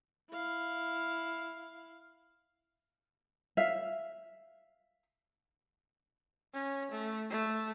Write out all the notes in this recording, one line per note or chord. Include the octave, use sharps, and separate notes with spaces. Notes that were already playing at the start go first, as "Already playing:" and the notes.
E4 F5
E5 F5
C#4
A3
A3